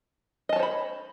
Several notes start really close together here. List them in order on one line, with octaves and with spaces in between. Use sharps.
D#5 A5 C#5 C5 B5